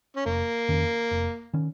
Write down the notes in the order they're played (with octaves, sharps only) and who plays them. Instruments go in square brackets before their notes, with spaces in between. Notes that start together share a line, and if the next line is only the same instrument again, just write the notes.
[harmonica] C#4
[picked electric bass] F1 [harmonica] A#3
[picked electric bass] F2 D#3 C#4
F1
D#3 C#4